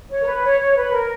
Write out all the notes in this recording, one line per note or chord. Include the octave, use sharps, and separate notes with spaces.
C#5
A#4
B4
C#5
C#5
B4
A#4